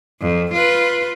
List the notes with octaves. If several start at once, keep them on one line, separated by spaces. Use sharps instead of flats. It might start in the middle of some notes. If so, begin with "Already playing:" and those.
F2
F4 B4